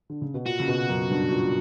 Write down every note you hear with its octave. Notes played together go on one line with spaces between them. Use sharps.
D3
C#3
B2
A#2 F#4
C#3
B2
F#2
G2
A#2